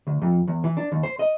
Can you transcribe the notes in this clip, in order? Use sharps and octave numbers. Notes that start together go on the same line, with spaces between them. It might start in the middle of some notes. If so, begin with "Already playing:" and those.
D2
F2
E2
E3
D4
D#2
C5
D#5